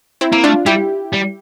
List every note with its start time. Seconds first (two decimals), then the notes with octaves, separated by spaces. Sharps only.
0.21 C4 E4
0.32 A#3 E4
0.44 A3 D4 F4
0.66 G3 E4 G4
1.13 G3